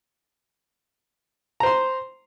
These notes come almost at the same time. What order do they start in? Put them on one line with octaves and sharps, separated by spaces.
A#5 C5 C6